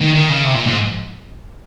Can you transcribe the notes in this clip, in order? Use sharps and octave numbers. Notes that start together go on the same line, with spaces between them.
D#3
D#3
C#3
C3
A#2
G#2